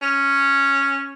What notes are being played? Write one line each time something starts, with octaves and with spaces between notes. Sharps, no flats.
C#4